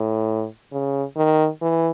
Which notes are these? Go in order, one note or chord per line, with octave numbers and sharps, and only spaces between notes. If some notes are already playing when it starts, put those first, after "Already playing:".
Already playing: A2
C#3
D#3
E3